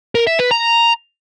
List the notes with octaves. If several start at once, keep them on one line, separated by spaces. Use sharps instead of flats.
A#4
E5
B4
A#5